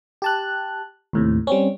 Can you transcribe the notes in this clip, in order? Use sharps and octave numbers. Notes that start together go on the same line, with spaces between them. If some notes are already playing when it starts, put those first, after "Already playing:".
G4 A5 F#6
D#2 A2 C3
G3 C4 C#4